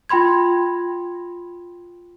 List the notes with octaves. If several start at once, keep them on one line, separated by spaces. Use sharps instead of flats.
F4 G5 B5 C6 G#6